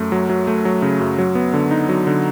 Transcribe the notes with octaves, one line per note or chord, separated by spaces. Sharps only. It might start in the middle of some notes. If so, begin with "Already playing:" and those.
Already playing: F#2 A3
F#3
F#3
A3
F#3
C#3
F#2
F#3
B3
D3
D#4
F#3
D3